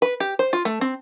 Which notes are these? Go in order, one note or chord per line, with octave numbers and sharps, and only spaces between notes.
B4
G4
C5
F4
A3
C4